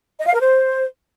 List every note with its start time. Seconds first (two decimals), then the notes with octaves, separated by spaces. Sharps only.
0.19 D#5
0.26 F5
0.33 A#4
0.40 C5